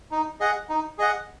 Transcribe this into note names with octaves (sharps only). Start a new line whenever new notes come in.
D#4
G#4 D#5 F#5
D#4
G#4 D#5 F#5